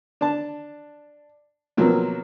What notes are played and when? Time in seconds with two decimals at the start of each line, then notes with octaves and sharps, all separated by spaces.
0.21 D4 A5
1.77 B2 F3 F#3 A#3 C4